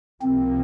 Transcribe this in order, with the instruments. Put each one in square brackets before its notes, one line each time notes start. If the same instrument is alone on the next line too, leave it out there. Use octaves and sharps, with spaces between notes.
[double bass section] C2 C3 F3 A#3 [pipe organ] C4